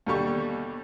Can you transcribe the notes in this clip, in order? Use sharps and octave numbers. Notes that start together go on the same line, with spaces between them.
D#2 B2 D3 G3 G4 C#6